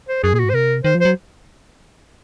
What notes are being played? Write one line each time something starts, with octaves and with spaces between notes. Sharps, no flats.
C5
F#2 G#4
A#2 G#4
F#4
G#2
C5
C3 A#4
D#3 C5
F3
F#3 C5